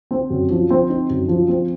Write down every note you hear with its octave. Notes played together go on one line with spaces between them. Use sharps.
C4
F#2
F3
C4
D#4
F#2
F3
C4